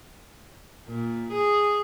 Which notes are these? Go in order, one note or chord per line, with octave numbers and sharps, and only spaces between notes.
A#2
G#4